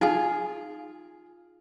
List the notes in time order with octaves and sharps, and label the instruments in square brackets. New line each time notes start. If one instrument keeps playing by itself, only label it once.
[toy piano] D#4 G#5 [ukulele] F4 G#4